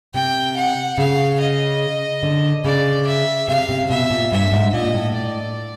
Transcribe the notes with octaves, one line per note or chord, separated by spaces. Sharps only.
C3 G5
F#5
C#3 F5
D#5
D3
C#3 D5
E5
C3 F5
C3
B2 E5
A#2
G2 E5
G#2
A#2 D#5
A2
D5